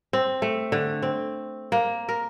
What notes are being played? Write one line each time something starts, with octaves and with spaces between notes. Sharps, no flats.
C4
A3
D3
C4
A#3
A#4